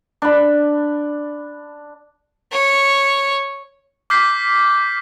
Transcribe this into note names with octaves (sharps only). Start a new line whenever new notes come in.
D4 B5
C#5
D6 F6 G6 B6 C7